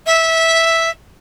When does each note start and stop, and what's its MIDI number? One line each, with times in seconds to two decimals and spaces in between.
0.06 0.90 76